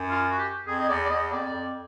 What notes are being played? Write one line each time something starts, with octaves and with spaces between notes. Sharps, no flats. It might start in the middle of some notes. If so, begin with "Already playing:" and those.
Already playing: F#2
F4
F#4
G4
F2 G#4
D#5
E2 D5
D5
E2 D#5
F2 D5
F2